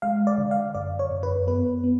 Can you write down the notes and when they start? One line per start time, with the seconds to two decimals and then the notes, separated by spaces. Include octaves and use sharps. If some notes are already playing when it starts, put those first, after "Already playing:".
0.02 G#3 F5
0.27 D5
0.38 D3
0.51 F5
0.75 F#2 D5
0.99 C#5
1.11 F#2
1.23 B4
1.47 B3 B4
1.84 B3